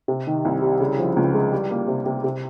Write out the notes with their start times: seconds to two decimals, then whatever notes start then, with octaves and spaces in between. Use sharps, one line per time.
0.08 C3
0.27 D#3
0.45 C2
0.62 G3
0.80 C#3
0.99 F3
1.16 C#2
1.34 G#3
1.52 G3
1.71 A#3
1.88 C3
2.06 C3
2.24 C3